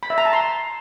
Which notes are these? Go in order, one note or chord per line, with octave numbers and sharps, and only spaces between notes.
B5
E5
A#5
A5
C6